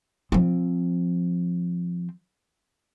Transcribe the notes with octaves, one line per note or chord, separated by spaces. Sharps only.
F3 C4